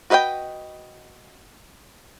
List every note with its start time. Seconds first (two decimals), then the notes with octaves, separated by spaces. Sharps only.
0.10 F#4 B4 D#5 F5 G5